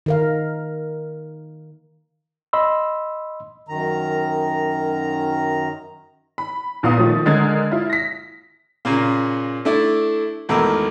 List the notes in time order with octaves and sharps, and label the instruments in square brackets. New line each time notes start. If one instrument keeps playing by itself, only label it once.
[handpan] D#3 A#4 F5
[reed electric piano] D#5 B5 C6 E6
[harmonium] F#2 D#3 A#5
[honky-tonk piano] B5
A#1 A#2 B3 F5 A#5 D#6
D#3 F3 A3
D3 G#3 A#4 D#6 G#6 A6
E4 F4
A#6 B6
[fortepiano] A#2 C#3 A#3
A3 D4 E4 D5
G#1 E2 A3 A#4 D6 E6